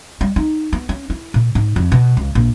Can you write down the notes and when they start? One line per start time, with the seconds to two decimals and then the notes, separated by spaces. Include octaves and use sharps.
0.21 G3
0.36 D#4
0.73 B3
0.89 C#4
1.10 E4
1.34 A#2
1.55 G#2
1.76 F2
1.92 B2
2.17 C#2
2.35 A#1